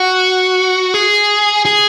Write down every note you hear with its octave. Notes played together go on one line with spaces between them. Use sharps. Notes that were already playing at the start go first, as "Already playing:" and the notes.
Already playing: F#4
G#4
G#4